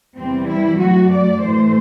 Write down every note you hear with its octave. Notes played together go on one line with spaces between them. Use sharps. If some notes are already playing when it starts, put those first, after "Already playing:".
E2 C3 E3 G3 C4
E4
F#2 F#3 A3 F#4
D5
A2 E3 A3 C5